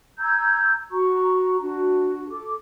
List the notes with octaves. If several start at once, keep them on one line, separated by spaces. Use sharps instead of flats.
A#5 E6 G6 G#6
F#4 A#5 C#6
D4 F#4
A4 D6